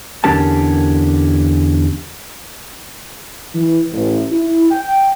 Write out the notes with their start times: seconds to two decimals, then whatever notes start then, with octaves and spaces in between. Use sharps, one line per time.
0.24 E2 D3 C#4 G4 A#4 A5
3.55 E3
3.92 A1
4.31 E4
4.71 G5